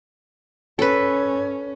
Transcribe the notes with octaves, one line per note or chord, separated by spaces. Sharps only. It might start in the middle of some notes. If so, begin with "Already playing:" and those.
C#4 A4 B4